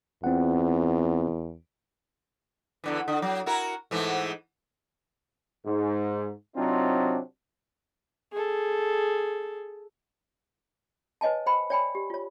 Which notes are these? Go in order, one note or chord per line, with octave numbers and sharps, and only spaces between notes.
E2 C4 F4 F#5
E2 D3 E3
D3
F#3
E4 F#4 A#4
G#2 E3 A3
G#2
C3 F#3 C4 D4 D#4 F4
G#4 A4
B4 C#5 D#5 G#5 A5
C5 G5 B5
C#5 D5 G5 G#5 B5
G4
F4 C#5